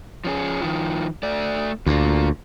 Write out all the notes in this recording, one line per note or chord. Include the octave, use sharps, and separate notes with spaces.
F3 C#4 G#4
D#3 F3
A3 D5
D2 A#2 F4